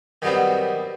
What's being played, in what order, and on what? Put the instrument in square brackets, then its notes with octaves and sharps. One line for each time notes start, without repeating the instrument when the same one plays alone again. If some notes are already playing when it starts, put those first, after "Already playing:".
[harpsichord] D#3 F#3 G3 B3 C4